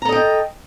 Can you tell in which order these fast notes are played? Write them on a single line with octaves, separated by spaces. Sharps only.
A#5 A4 D#5 G5